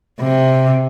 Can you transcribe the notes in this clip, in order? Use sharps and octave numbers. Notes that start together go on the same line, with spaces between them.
C3